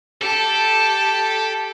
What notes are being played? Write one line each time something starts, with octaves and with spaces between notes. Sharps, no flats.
G4 A4 A5